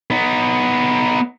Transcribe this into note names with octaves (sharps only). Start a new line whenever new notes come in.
B3 D#4